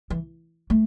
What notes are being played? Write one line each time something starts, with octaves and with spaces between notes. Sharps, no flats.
E3
A3